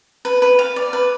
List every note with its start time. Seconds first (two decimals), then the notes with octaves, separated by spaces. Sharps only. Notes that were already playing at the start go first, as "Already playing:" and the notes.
0.25 B4
0.42 B4
0.59 F5
0.76 D5
0.93 B4